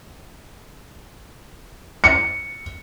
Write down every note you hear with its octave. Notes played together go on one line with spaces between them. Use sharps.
C#7